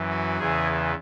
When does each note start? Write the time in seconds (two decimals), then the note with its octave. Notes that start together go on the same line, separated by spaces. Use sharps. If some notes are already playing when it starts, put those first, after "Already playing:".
Already playing: F#2 E3
0.10 F#4
0.38 E2 C#3 E3 G#4